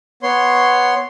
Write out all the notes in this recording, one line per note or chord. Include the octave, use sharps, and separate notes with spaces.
B3 C#5 C6